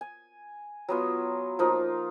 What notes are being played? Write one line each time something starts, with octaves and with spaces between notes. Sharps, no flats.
G#5
F#3 B3 F4
F3 A#3 D#4 F4